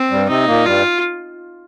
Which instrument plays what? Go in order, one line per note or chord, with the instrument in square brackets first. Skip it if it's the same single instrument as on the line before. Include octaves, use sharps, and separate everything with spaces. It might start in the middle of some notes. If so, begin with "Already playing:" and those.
Already playing: [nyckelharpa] C4
[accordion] G2 G3
[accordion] C3 C4 [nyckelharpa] D#4
[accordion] A#2 A#3
[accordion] G2 G3 [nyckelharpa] F4